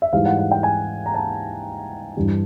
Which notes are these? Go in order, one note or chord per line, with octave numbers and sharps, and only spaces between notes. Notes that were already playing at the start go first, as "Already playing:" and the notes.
E5
G#2 E3 G3 F5
F#5
F#5
G5
G#5
A#5
A5
G2 E3 G3